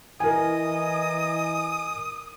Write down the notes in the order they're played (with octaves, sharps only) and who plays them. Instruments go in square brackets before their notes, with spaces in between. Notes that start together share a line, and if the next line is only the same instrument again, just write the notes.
[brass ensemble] E3 D#5 [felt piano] A#4 G#5 [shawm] D#6